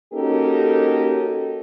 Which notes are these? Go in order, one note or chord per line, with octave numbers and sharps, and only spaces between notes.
A#3 C#4 D#4 F#4 G4 A4